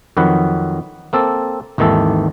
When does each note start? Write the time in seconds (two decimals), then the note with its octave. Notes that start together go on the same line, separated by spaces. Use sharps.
0.17 F2 D#3 F#3 B4 F#5
1.13 A#3 C4 A4
1.78 G#1 D#2 D#3 E3 A4